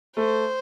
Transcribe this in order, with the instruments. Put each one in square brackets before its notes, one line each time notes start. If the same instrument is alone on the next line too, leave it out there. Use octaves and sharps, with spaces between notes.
[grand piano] A3 [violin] C5